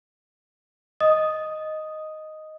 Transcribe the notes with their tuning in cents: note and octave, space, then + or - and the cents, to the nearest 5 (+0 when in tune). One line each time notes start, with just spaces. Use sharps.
D#5 +0 D#6 +0